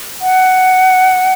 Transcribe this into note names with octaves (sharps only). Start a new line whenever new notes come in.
F#5